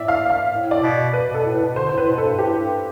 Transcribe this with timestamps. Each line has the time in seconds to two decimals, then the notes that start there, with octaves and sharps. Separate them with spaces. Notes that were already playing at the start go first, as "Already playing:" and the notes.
Already playing: A2 D5 E5
0.08 F5
0.30 F5
0.51 A2
0.71 D5
0.82 B2
1.13 B4
1.29 B2
1.34 A4
1.45 A2
1.55 B4
1.60 B2
1.76 D3 C5
1.89 A2 C5
1.98 B4
2.08 B2
2.18 A4
2.23 G2
2.38 A2 G4
2.59 G2